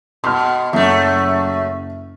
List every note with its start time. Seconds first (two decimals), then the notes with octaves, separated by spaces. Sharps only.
0.24 B2 C6 F6
0.73 F#1 F#2 A3 E5